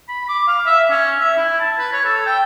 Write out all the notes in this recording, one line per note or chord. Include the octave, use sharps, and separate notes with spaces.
B5
D6
F5
E5
C#4
E5
E4
A5
B4
C#5
A4
G5